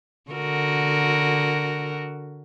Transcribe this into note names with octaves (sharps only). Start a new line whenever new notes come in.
D3 F#4 A#4